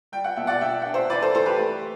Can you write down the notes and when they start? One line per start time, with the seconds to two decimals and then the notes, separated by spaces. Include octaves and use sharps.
0.12 G3 G5
0.24 F#5
0.36 B2 E5
0.47 D5 F#5
0.61 D4 E5 G5
0.82 D4 F#5
0.94 C5 E5
1.10 E3 B4 D5
1.22 A4 C5
1.35 E3 A4 C5
1.46 G4 B4
1.58 A3